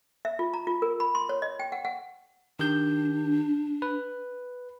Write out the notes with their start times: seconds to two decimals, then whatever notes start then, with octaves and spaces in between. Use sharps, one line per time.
0.25 E5
0.39 F4
0.54 A#5
0.67 F4
0.82 A#4
1.00 B5
1.15 C6
1.29 C#5
1.42 D#5
1.59 G5
1.72 F#5
1.85 F#5
2.59 D#3 D4 G4 G6
3.82 B4